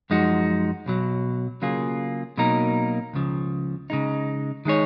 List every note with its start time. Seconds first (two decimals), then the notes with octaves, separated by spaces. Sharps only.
0.10 F#2 F3 G#3 D#4 F#4
0.86 B1 B2 F#3
1.62 C#3 F#3 A#3 F4 G#4
2.37 B2 F#3 A#3 D#4 A#4
3.13 C#2 C#3 F3
3.90 C#3 G#3 D#4
4.65 D#3 G#3 D#4 G#4 C#5